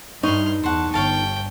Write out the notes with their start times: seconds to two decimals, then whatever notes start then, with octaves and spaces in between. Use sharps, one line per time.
0.23 G2 D#4 E4 C#5 C6 F6
0.63 E2 C5 F#5 A5 C#6
0.94 G1 C#5 F5 G5 A5